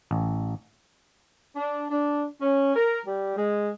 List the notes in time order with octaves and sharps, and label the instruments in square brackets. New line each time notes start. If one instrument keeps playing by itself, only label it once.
[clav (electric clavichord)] A1
[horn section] D4
D4
C#4
A#4
G3
G#3